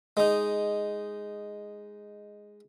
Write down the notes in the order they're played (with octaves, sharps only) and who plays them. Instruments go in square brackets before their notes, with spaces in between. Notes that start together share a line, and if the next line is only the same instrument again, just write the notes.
[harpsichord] G#3 D#4